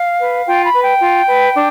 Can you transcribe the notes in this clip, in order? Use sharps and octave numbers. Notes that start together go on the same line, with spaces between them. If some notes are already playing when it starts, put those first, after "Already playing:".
Already playing: F5
B4
F4 G5
B5
B4
G5
F4
B4
D4